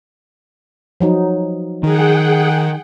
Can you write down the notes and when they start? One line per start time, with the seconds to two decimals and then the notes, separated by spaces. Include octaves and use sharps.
1.00 F3 F#3 D#4
1.83 D#3 G#4 F#5 G5